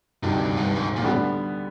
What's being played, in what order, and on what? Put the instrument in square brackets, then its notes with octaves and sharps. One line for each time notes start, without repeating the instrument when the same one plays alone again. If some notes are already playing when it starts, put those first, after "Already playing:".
[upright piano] D2 C3 D#3 [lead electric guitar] G2
[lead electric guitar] G#2
G2
G#2
A#2
[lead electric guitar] A2 [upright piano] D3 G3 B3